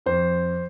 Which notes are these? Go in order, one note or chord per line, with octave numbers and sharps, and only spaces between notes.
F2 C5